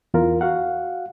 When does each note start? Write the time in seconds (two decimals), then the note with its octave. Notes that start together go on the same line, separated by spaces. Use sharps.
0.14 E2 F4 A#4
0.41 F#4 F5 F#5